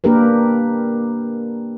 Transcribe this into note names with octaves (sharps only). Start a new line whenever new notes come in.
A#3 D4 G4 A#4 B4